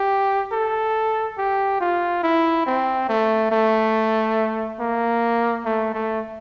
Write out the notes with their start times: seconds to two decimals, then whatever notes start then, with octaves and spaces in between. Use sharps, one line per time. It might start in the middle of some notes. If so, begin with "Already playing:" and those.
Already playing: G4
0.52 A4
1.38 G4
1.81 F4
2.23 E4
2.66 C4
3.09 A3
3.52 A3
4.80 A#3
5.65 A3
5.94 A3